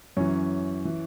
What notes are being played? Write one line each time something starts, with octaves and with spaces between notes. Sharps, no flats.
F#2 E3 C#4
E3